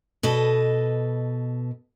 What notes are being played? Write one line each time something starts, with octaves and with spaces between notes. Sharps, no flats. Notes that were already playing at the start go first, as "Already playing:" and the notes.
B2 A4 B4 D#5